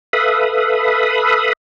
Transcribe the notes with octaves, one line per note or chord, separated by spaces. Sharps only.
A4 B4 E5 F5 B5 D#6